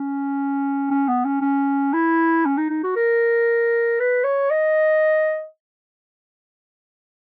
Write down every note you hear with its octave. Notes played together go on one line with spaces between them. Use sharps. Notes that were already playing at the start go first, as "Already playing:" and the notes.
Already playing: C#4
C#4
B3
C#4
C#4
E4
C#4
D#4
D#4
F#4
A#4
B4
C#5
D#5